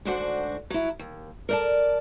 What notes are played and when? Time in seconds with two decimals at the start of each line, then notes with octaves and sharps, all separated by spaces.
0.05 D2 G#2 D4 F#4 C5 F#5
0.70 F#3 E4
0.99 D#2
1.49 A#4 D5 A5